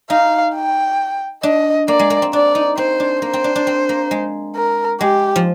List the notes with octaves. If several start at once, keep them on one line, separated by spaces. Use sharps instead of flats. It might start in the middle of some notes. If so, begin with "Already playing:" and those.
D#4 F5
G5
D4 D#5
A#3 D5
G#3
A#3
C4
D4 D5
D#4
C4 C5
D4
A#3 C5
C4
D4
D4
C4
A#3
G#3
A#4
G#3 G4
F3